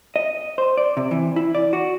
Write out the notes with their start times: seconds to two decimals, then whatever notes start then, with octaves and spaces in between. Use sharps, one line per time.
0.16 D#5
0.58 C5
0.77 D5
0.97 C3
1.11 E3
1.36 E4
1.55 D5
1.73 F#4